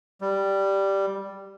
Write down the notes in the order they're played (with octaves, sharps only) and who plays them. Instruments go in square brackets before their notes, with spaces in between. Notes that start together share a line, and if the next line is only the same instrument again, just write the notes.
[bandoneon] G3